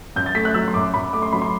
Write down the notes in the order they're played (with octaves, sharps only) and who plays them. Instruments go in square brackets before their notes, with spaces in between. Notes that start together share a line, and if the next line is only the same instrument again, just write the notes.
[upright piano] F#2 G6
A6
A3 B6
F#6
F#3 E6
C6
F#2 D6
F#2 B5
A3 D6
C6
F#3 B5
C6